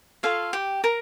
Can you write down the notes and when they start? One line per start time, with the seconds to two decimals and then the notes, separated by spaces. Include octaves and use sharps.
0.23 F4 A4 C#5 F5
0.53 G4 G5
0.84 A#4 A#5